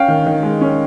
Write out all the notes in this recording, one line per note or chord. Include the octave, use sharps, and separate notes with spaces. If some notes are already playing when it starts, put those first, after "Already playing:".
Already playing: C#4 F5 G5
D#3
D#3
G#3
C#4